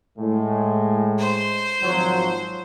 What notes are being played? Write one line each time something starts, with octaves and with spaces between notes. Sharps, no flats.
A2 G#3
C5
G#1 F3 F#3